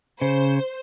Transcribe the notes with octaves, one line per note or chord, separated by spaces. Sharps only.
C#3 C5